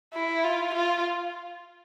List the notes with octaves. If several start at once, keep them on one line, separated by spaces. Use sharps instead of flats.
E4
F4
F4